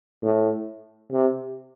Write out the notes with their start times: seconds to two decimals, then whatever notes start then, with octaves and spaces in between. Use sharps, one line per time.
0.22 A2
1.12 C3